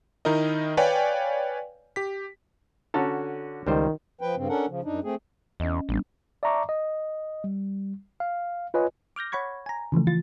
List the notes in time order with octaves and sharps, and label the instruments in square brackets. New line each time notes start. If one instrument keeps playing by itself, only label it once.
[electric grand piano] D#3 D#4 E4 A#4 D#5
B4 C#5 D5 F5 G5 G#5
G4 B6
[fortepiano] D3 C#4 F#4 [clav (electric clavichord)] A4 A5 A#5
[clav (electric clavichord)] C#2 G3 C5 [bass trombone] D#3
[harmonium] F3 B4 G5
G2 C#3 C4
C#4 D4 A4 A#4 F#5
C#3 F3
F#2 D4 D#4
A3 C4 G#4
[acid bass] E2 [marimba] C#4 D#5
[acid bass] A1 [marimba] G3 B3 D4
[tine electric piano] D5 E5 A5 A#5 C#6 D6
D#5
G3
F5
F4 B4 C#5 D#5 G#5
[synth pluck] D6 F6 G6 A#6
C#5 F#5 B5 C#6 G#6
G#5 A#5
C#3 E3 F3 A3
E3 F4 A6